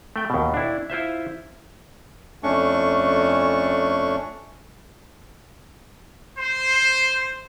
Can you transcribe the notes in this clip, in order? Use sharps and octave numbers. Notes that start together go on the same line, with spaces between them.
A3 G5
D#2 B2
D4 E4
E4 F4 C5 E5
F2 A3 C#4 D4 C#6
C5